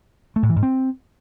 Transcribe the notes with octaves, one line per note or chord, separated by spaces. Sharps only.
A3
A2
E3
G#2
C4